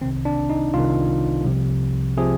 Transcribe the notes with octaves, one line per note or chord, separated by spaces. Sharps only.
C2 C3 D#3 C4
D4
D#4
C2 C3 D#3 F4
C2 C3 F3
C3 F3 G#4